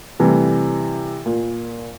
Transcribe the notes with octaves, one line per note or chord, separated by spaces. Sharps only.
C3 E3 G3 A3
A#2